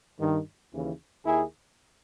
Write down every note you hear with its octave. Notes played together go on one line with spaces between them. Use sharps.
G2 D#3
D#2 C#3 E3
D#2 D#3 E4 G#4